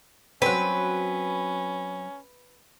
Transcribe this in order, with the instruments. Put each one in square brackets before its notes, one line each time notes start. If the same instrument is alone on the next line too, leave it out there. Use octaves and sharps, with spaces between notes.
[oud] F#3 C4 [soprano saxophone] C#4 [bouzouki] B4